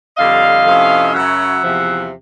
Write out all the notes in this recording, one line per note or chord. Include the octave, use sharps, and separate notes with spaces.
F2 D3 G3 D#5 F5
C3 F3 A3 C#4 E4
F#2 C#3 F#3 E5 F#5
E2 C3 F3